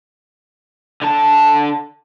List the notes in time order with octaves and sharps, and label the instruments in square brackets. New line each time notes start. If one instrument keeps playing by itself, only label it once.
[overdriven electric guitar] D3 A5